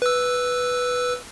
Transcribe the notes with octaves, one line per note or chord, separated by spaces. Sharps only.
B4 E6